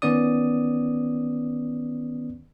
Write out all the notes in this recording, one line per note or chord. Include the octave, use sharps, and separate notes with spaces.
D#3 B3 C#4 D5 D#6